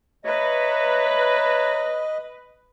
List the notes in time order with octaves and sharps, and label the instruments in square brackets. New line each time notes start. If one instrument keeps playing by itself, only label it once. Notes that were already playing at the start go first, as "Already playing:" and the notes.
[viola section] B4 [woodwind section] C#5 E5 A#5 [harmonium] D#5